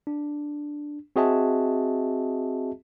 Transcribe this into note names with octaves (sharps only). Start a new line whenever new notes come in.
D4
C4 F#4 G#4 D#5 E5 A5